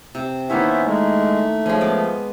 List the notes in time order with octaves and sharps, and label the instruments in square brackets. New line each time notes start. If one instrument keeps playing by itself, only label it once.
[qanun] C3
[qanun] D#3 A#3 E4 [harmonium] B3 C5 E5 [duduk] C#4
[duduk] G#3 [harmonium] A3
[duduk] F3 [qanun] G#3 C#4
[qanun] B3 D6